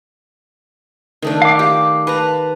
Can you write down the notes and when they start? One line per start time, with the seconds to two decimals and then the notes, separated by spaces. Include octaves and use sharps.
1.22 D#3 A3 D4
1.42 F5 D6
1.59 G4
2.07 B4 A5 A#5